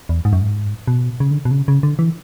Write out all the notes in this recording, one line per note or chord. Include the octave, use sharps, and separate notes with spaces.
E2
G#2
F#2
G#2
B2
C#3
D3
B2
C#3
C#3
D3
E3